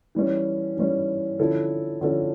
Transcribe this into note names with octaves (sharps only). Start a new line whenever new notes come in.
E3 G3 C#4
E3 G3 C#4
D3 F3 C#4 E4 A4
D3 F3 C#4 E4 A4